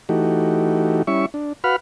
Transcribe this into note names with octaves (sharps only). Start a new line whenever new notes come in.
E3 A3 D#4 F#4 G4
G3 C#4 E4 E5 C#6
D4
F#4 B4 F5 F#5 B5 F6